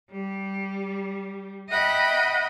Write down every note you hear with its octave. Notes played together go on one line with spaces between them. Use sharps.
G3
D#5 E5 F#5 G5 B5